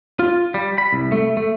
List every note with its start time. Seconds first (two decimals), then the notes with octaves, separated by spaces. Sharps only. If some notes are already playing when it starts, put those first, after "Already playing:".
0.19 F4
0.54 G3
0.78 B5
0.93 C2
1.12 A3
1.37 A3